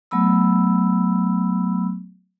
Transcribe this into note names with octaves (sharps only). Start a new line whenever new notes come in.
F#3 A3 B3 B5 E6